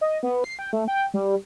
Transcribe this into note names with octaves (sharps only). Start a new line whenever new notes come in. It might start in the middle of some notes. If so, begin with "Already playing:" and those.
D#5
B3
C7
G5
A3
G5
G3